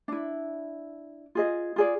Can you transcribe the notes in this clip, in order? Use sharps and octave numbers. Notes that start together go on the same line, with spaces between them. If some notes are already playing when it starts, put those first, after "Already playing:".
D4 E4
F4 G#4 D#5
F4 G#4 D5